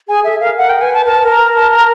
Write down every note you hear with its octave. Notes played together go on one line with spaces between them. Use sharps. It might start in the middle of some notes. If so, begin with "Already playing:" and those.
G#4 G#5
A4 E5
A#4 F5
A#4 F#5
G5
B4 G#5
A5
A#4 A5
B4
A#4
A#5
A5
A#5